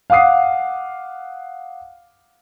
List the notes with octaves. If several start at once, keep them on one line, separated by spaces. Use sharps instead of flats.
F5 F#5 D6 D#6 C7